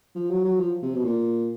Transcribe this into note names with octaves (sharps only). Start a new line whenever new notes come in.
F3
F#3
F#3
F3
C3
B2
A#2